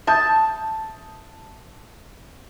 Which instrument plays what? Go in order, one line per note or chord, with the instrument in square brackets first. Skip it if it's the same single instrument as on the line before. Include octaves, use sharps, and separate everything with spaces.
[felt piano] E5 D#6 G6 [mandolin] A5